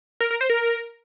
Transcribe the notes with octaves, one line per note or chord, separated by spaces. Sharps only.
A#4
A#4
C5
A#4